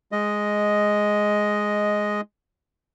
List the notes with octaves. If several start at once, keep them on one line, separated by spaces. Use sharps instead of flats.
G#3 D#5